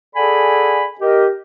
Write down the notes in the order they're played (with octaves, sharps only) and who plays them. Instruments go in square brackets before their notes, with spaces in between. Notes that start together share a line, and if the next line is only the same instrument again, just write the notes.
[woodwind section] G#4 A4 D5 F#5 G#5 B5
G4 A#4 D#5